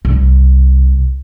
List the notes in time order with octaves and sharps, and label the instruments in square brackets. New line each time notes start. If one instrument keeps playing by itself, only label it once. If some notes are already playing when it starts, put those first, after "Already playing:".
[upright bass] C2